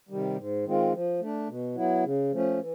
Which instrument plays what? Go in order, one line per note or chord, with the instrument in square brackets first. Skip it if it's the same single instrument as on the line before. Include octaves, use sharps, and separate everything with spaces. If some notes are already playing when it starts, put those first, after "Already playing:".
[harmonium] C3 D#3 G3
G#2
D#3 G#3 C4 F4
F3
A3 D4
B2
F#3 B3 E4
C#3
F3 A3 C#4
E3